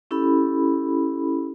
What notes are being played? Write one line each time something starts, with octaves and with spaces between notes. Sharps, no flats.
C#4 E4 G4 A4 B5